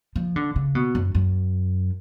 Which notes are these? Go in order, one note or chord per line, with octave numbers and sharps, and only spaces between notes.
F3
D3
C#3
B2
F#2
F#2